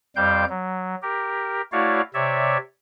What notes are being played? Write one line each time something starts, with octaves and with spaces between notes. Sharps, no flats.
F2 G3 C5 F5 G5 G6
F#3
G4 A#4
A3 E4 F#4 C#5 D5 F5
C3 C#5 D5 E5